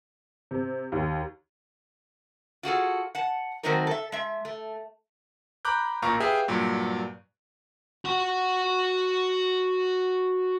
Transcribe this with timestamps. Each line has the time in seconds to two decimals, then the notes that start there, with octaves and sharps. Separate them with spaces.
0.51 C3
0.92 D#2
2.63 F4 F#4 G#4 A4
3.15 F#5 A5
3.63 D#3 F#3 A3 C4 D#4 A#4
3.87 A4 E5
4.12 G#3 E5
4.45 A3
5.65 A#5 B5 D6 F#6 G6
6.02 A1 A#2 A#4 F5 A#5 C#6
6.20 G4 G#4 B4 E5 F5 G5
6.48 G2 A#2 F#3
8.05 F#4 F#5